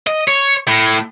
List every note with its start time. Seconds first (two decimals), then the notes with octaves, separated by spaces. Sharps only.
0.07 D#5
0.28 C#5
0.68 A2